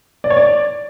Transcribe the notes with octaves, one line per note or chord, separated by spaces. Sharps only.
D5
C#5
D5